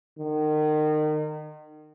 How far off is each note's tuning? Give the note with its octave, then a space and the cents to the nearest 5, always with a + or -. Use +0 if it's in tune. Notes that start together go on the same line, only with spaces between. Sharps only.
D#3 -30